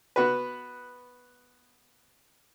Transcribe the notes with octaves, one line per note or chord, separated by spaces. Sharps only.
B3 F#4 B4